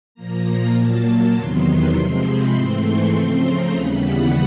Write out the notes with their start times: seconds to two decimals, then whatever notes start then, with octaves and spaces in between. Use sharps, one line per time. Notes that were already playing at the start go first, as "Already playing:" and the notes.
0.14 A#2 F3 A#3 A#5
0.74 A#2 F#3 A#3 A5
1.04 A5
1.34 E2 C3 D#3 F#3 B3 C6
1.64 C6
1.94 C3 F3 G#3 C4
2.23 B5
2.53 G#2 E3 A3 C4 C6
2.83 C#6
3.13 C#3 F3 A3 C4 C6
3.43 A#5
3.72 D#2 C#3 E3 G3 B3 B5
4.02 F#5